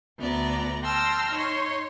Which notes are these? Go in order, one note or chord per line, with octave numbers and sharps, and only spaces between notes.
D2 B3 D5 A#5
G5 A5 A#5 C6 E6 F6
D#4 C#5 C6